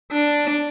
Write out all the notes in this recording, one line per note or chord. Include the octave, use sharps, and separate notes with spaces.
D4